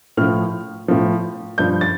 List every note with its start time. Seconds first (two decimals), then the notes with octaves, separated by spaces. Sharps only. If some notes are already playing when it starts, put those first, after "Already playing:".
0.17 A2 F3 F6
0.88 A2 F3
1.58 G2 F3 G6
1.81 A6